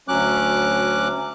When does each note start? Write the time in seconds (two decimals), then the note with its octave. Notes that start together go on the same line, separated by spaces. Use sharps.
0.08 D2 F#3 C#4 D6 F#6